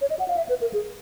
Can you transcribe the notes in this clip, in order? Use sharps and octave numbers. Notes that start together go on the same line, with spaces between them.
C#5
D#5
F#5
F5
E5
B4
A#4
G#4